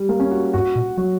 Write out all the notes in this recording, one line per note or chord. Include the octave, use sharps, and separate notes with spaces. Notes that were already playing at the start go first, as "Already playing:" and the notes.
Already playing: G3
A#3
C#4
F#4
G2 F#4
A#2
F#3 F#4